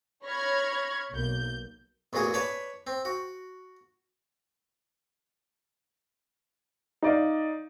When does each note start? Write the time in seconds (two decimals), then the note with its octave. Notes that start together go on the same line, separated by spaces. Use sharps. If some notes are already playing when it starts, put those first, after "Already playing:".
0.24 C#5 B5 C#6 F6 G#6 A#6
1.12 B1 A#3 G6
2.13 A1 E2 A#2 F#4 G#4 D#6
2.34 B4 C#5 D5 A5 B5
2.87 C4
3.05 F#4
7.02 D#4 D5 F5